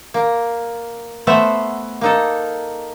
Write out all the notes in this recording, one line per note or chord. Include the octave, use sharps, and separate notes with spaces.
A#3
A3 B3 C5 E5 F#5
A#3 D#4 A4